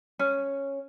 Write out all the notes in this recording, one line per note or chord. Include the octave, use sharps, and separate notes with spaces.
C#4